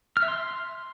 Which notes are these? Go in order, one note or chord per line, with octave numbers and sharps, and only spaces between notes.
F6
E5
C6